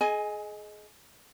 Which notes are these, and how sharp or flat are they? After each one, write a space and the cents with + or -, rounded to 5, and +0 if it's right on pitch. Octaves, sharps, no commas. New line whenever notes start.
G#4 +30 D#5 +0 G#5 +0